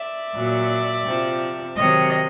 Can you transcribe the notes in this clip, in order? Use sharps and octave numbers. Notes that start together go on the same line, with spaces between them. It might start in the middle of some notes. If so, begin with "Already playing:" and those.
Already playing: D5 E5
A#2 F#3
C3 F3
C3 D#3 F#3 C#5 D#5